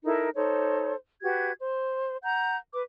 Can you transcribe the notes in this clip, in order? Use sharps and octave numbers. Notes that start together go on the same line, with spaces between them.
D#4 E4 A4 A#4
D#4 A4 C5 C#5
F#4 G4 B4 G#6
C5
F#5 A#5 G6
B4 D6